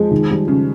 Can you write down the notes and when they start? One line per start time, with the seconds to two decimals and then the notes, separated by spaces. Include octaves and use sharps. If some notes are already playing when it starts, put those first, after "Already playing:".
Already playing: F3 G#3
0.11 D#3
0.30 G3
0.48 C#3 G3